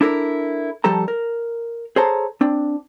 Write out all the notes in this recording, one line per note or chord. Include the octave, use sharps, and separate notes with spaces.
D4 E4 A4 A#4
F3 G3 G4 A4 A#5
A#4
G#4 A4 C5 C#5 A5 A#5
C4 D4